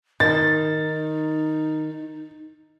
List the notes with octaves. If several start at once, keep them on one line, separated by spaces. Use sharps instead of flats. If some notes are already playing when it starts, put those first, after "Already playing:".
D#3 D#4 A6